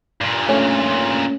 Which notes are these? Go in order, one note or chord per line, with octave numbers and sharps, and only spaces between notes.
G2 A#2
A3 C#4